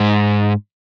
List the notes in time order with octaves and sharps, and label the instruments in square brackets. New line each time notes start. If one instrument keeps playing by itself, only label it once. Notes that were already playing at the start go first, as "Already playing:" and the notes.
Already playing: [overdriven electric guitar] G#2